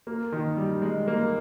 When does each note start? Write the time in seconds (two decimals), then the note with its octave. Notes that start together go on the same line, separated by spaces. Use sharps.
0.07 A#3
0.32 D#3
0.57 G3
0.82 G#3
1.08 A#3